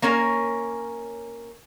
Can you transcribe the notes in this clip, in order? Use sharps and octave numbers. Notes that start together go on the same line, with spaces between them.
A#3 C#4 A#4 C#5